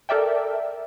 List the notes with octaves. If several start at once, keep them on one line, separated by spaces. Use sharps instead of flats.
A4 A#4 D5 E5 G5